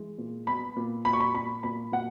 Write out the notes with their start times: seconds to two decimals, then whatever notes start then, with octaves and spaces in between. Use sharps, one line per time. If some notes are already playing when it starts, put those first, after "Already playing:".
Already playing: E3 G#3
0.18 A#2
0.47 B3 B5
0.77 A#2
1.05 A#2 B5
1.13 C#6
1.20 B5
1.34 A#2 B5
1.63 A#2 B5
1.92 A#2 F#5